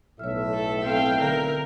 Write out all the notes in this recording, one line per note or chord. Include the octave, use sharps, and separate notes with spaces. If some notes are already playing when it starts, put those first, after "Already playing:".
B1 A2 C#5 E5 F6
A4
C4 A4 F5 G5
D3 A#4 F5